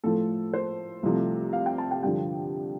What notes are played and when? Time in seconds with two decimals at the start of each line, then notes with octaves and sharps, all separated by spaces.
0.04 A2 F3 A3 A4
0.53 C5
1.03 C2 C3 F3 A3
1.53 F5
1.66 G5
1.78 A5
1.91 G5
2.03 G2 D3 F3 G5